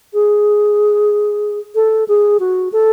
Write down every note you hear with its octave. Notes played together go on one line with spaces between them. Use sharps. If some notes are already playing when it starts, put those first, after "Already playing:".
G#4
A4
G#4
F#4
A4